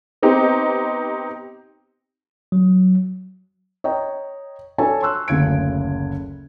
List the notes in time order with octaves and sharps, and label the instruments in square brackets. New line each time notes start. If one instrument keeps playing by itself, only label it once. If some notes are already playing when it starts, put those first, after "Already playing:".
[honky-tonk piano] B3 C4 D#4 G4
[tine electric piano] F#3
[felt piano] C#5 D#5 G5 A#5
D4 F#4 A4 C#5 G#5 A5
C6 C#6 E6 F#6
F#1 D2 C#3 G#6 D7